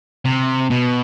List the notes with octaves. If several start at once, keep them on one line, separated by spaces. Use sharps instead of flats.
C3
B2